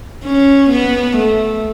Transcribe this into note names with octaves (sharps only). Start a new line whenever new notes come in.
C#4
B3
A3